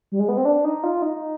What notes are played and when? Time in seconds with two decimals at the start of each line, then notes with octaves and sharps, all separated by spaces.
0.12 G3
0.20 G#3
0.29 B3
0.37 C4
0.45 D4
0.64 D#4
0.84 F4
1.02 D#4